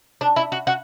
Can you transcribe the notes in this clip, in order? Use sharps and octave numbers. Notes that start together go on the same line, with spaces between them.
D4
E4
F#4
F#4